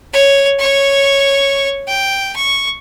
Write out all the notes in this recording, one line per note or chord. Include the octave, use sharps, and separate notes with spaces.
C#5
C#5 C#6
G5
C#6